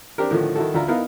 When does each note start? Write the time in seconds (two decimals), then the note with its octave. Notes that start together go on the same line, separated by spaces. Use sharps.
0.18 C4 D4 G4 A#4
0.31 A2 D3 D#3 F3
0.56 D#3 E4 F#4 A4
0.74 D2 E3 E4 F4 E5 A#5
0.88 B3 D#4 E4 A#4 F5